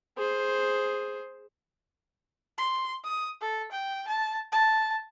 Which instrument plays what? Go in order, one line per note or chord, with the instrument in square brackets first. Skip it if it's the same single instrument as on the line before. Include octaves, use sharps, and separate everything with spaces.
[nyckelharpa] G#4 C5
[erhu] C6
D#6
A4
G5
A5
A5